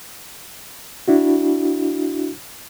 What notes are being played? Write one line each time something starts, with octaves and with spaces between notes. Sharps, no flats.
D4 E4 F#4